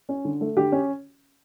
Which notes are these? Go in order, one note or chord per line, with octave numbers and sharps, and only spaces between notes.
C#4
D3
A3
D3 G4
C#4